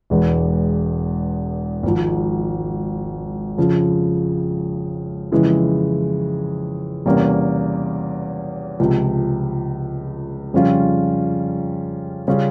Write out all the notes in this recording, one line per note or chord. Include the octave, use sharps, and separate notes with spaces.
E1 E2 E3 G#3
G#1 G#2 F3
F2 C#3 F3
F2 C#3 E3 G#3 E4
E2 C3 G3 A#3 C#4
C#2 C3 F3
F2 C#3 G3 C#4 F4
C#3 G3 C#4 F4